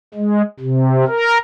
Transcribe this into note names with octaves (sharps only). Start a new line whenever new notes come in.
G#3
C3
A#4